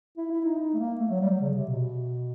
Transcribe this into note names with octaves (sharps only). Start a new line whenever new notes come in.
E4
E4
D#4
D#4
A3
A#3
A3
F#3
G3
F#3
C#3
C3
B2